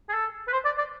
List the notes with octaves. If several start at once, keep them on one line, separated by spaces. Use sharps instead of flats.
G#4
A4
B4
C5
D5
D5